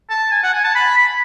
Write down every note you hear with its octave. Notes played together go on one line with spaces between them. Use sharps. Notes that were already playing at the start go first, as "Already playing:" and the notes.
A5
G#5
F#5
G#5
A5
B5
B5